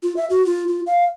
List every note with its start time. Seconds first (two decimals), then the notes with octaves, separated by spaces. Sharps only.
0.03 F4
0.17 E5
0.30 F#4
0.46 F4
0.68 F4
0.87 F5